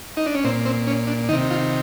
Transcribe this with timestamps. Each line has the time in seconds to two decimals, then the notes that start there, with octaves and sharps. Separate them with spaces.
0.17 D#4
0.26 D4
0.35 C#4
0.44 A#2 C4
0.65 C4
0.87 C#4
1.07 D4
1.29 C3 D#3 D#4
1.50 F4